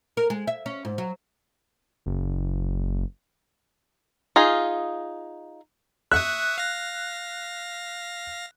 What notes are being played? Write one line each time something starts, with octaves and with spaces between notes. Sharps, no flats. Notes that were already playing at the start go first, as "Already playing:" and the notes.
A#4
G#3
E5
C#4
G#2
F#3
F#1
D#4 F4 G#4
E5 C#6 D#6 F#6
F5 A#6